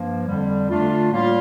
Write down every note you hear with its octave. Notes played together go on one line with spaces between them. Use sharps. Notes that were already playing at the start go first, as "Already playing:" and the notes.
Already playing: G2 F3 A#3
F2 D3 G3
D3 A3 D4 F4
A2 G3 A#3 F4